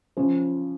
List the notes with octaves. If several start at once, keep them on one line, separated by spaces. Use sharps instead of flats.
C#3 F3 C#4